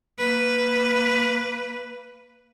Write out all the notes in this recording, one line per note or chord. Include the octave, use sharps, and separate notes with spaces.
A#3 B4